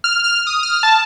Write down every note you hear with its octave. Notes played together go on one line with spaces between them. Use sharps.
F6
F6
D#6
F6
A5